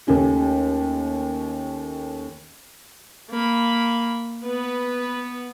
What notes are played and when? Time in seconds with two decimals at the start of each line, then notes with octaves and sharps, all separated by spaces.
0.07 D#2 A3 C#4 G4
3.30 A#3 B5
4.43 B3 B4